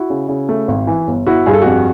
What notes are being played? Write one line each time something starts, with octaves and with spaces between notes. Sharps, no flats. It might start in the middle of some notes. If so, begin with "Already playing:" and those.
Already playing: E4 F#4
C#3
C#3
A3
G#1
E3
G1
G1 E4 F#4
G2 G#4
A4
F2 F#4 G#4